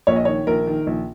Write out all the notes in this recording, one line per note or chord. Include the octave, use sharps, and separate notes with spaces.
A#1 C#5
D#5
D#3 C#5
A#1 A#4
D#3
A#1